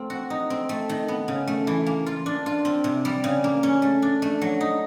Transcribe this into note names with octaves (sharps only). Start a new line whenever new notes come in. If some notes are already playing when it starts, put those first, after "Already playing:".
Already playing: A3 C4 F4
F#4
D#4
C4
A3
D#3
B3
C#3
A3
E3
A#3
F4
D4
F4
C4
C3
G3
C#3
A#3
C#4
A3
D4
A3
F#3
D#4